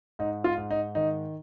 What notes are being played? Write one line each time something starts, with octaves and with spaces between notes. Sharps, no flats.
G#2 D#4
F4
G#2
D#4
D#3 D#4